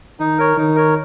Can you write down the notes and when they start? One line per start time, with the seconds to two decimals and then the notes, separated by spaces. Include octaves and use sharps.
0.20 D#3 D#4
0.38 A#4 C#5
0.57 D#3 D#4
0.76 A#4 C#5